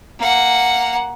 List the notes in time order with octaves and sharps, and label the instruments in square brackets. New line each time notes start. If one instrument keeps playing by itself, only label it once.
[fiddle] A#3 F#5